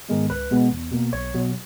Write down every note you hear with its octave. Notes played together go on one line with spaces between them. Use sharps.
G#2 D#3 G#3 B3
C#2 B4
B2 G#3 B3
E2
B2 A#3
B1 C#5
B2 F#3